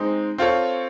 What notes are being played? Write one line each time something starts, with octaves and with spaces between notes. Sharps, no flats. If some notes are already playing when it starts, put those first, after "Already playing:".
Already playing: G#3 C4 D#4
C4 F4 A4 C#5